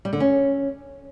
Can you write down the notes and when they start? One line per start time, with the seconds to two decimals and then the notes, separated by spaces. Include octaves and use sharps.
0.05 G3
0.13 D3
0.20 C#4